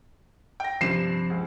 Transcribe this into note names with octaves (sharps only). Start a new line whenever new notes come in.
G5 A#6
G2 C3 F3 C7 E7
C#2